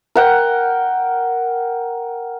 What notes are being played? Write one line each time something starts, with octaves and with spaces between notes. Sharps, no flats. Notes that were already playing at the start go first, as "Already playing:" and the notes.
A#4 F#5 G5